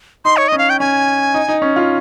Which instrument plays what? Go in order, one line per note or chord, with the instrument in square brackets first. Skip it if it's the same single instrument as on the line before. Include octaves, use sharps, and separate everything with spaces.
[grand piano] D#4 [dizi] C6
[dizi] C#5
[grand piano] C#4 [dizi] D#5
[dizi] F5
G5
[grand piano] C#4 [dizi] G#5
[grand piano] D#4
D#4
C#4
F4